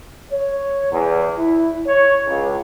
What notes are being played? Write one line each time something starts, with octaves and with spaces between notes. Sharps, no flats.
C#5
E2
E4
C#5
C#2